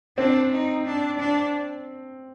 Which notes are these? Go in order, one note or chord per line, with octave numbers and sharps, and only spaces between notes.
C4 D4
D#4
D4
D4